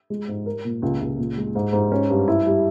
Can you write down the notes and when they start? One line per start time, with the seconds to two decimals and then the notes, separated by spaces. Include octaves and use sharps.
0.10 G#3
0.28 G#2
0.46 A#4
0.65 A#2
0.82 C#2
1.01 C#2
1.18 A#2
1.37 G#3
1.55 G#2
1.73 G#2
1.92 C#4
2.10 G2
2.28 E4
2.46 G3